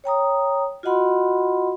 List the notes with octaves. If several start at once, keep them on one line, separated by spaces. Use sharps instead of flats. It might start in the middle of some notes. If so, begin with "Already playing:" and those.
C#5 G5 A#5 D#6
F4 F#4 D#5 F#5 B5 C6